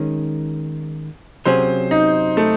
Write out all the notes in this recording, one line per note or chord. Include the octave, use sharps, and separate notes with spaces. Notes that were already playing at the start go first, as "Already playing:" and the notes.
Already playing: D#3 G#3 C#4
C3 F#3 C#4 G#4 C5
D#4
A3